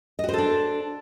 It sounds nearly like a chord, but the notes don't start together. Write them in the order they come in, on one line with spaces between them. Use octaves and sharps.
D#5 F#4 C5 A4 D4